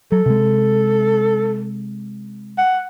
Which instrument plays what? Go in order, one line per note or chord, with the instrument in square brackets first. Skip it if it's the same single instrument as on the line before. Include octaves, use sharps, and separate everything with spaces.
[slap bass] F#3 [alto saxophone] A4
[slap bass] C3 G#3
[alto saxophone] F#5